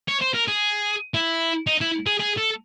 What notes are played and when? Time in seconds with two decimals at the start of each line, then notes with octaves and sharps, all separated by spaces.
0.08 C#5
0.22 C5
0.35 A#4
0.48 G#4
1.14 E4
1.67 D#4
1.81 E4
2.07 G#4
2.20 G#4
2.38 A4